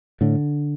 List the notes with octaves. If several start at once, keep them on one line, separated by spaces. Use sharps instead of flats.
A2 D3